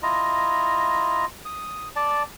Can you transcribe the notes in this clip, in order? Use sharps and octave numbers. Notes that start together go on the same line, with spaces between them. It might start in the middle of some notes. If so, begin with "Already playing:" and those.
E4 F4 D#5 A#5
D#6
D5 A5